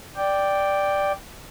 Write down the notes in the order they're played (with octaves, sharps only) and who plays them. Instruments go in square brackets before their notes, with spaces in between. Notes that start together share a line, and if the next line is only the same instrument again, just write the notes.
[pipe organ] D5 G5